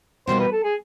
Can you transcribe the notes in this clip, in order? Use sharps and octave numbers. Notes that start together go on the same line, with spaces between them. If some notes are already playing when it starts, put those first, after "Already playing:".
B2 G3 A#3 D#4 C5
B4
A4
G#4